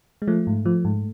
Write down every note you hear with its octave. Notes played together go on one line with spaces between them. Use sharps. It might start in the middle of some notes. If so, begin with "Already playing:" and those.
G#3
F3 A3
G#2
F3
G#2